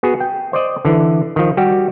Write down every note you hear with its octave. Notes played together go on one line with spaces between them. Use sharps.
B3 F#4 G#4
G5
C5 D5 D#5
D3 E3
D#3 F3
G3 F#4 G4